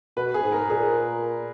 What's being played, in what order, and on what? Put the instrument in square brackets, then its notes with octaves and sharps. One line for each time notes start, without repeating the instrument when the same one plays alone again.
[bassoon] B2 [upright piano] B4
[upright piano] G#4
[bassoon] G#2
[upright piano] A#4
[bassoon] A#2 [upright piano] G#4